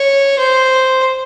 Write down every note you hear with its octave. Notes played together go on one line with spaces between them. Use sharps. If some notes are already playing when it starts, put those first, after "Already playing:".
Already playing: C#5
C5